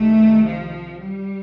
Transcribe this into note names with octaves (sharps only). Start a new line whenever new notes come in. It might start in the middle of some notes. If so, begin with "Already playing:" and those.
Already playing: C2 C3 D#3 A3
F3
G3